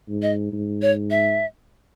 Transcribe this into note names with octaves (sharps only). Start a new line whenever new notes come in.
G#2
D#5
G#2
C#5
E5